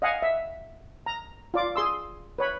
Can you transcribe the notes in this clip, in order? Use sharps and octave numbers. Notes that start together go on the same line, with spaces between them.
D#5 F5 F#5 G#5
E5
A#5
F4 D5 D6
G#4 C6 E6
B4 C#5 B5